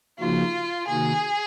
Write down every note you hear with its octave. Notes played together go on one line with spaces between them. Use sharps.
C#3 F3 A#3 D#4 F4 F#4
C3 D#3 A#3 D#4 F#4 G#4